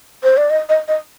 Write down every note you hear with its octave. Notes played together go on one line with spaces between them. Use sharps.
C5
D5
D#5
D#5
D#5